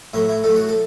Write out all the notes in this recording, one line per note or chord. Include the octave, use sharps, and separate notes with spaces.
A2 F#3 A3 E4
E4
A2 F#3 A3 A4
F#4
A4